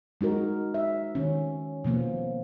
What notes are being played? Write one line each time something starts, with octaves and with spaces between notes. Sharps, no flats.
G#3 D#4 F#4 A#4
E5
D#3 C#4
B2 F3 A#3 B3